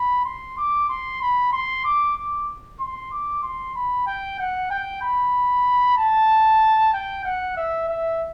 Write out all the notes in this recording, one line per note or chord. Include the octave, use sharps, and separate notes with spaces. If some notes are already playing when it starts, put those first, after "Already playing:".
Already playing: B5
C6
D6
C6
B5
C6
D6
D6
C6
D6
C6
B5
G5
F#5
G5
B5
A5
G5
F#5
E5
E5